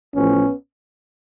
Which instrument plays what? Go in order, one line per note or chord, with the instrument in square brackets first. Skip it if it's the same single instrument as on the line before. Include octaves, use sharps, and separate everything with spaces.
[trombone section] A1 A2 F3 B3 C#4